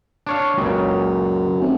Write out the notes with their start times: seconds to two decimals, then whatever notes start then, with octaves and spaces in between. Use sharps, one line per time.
0.27 D4 C#5 F5
0.58 C#2 F#2 A#2 C#3
1.61 F1